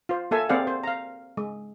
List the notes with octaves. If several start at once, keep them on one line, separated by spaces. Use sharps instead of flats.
F4 C5
A#3 A4 E5 G#5
A#3 C4 G#4 D5 F5 F#5
C5
F5 A#5
G#3